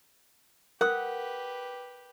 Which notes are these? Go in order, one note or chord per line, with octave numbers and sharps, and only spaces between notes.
G4 A#4 B4 F#5 D#6